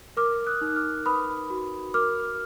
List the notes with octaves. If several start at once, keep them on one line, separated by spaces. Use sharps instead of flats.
A#4 D6 F6
D#6 F#6
D#4
D6 F6
B4 B5 D#6
F#4
A#4 D6 F6